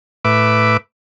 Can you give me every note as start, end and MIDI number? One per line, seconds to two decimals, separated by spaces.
0.25 0.77 45
0.25 0.77 71
0.25 0.77 76
0.25 0.77 86